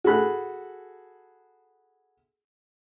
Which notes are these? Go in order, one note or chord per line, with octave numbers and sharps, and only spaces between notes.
F#4 G#4 A4 B5 F#6